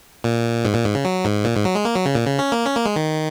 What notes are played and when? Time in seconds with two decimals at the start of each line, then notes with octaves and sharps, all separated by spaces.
0.24 A#2
0.64 G#2
0.75 A#2
0.85 G#2
0.95 C#3
1.05 F#3
1.25 G#2
1.45 A#2
1.55 G#2
1.65 F#3
1.75 G#3
1.85 A#3
1.95 F#3
2.06 C#3
2.15 A#2
2.26 C#3
2.39 C#4
2.52 A#3
2.66 C#4
2.76 A#3
2.86 G#3
2.96 D#3